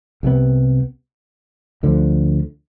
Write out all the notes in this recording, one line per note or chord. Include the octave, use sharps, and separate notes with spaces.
C2 C3 F3 B3
D2 D3 F3